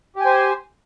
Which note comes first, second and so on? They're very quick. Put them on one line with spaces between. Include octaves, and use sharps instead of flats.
G4 G#5 C5